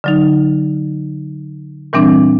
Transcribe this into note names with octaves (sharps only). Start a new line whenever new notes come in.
D3 F#3 D#4
A#2 E3 G3 C4 D4